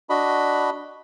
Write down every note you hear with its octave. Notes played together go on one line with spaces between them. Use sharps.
D4 F#4 D#5 B5